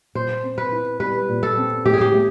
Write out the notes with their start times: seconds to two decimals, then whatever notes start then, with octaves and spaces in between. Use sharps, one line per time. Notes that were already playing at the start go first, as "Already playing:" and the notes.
0.15 A#2 C5
0.43 C4
0.58 B4
0.72 E4
1.00 G3 B4
1.29 A#2
1.43 A4
1.57 C4
1.85 A2 G4
1.93 G#4
2.01 G4
2.13 A3